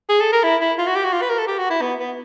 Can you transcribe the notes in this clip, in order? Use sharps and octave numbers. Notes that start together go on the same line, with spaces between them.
G#4
A4
A#4
E4
E4
F4
F#4
G4
F#4
F4
B4
A#4
A4
G4
F#4
E4
B3
B3